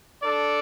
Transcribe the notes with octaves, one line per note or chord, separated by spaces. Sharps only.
D4 A4 D5